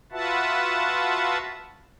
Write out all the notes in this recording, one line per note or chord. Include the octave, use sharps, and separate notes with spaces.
F4 F#4 B4 E5 F#5 A5